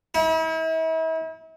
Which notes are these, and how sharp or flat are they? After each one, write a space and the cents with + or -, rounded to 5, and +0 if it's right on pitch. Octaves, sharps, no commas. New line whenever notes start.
E4 -40